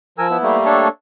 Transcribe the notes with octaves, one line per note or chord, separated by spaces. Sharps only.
F3 A#4 G#5 E6
B3 E4
G3 A3 A#3
D4 A4 C#5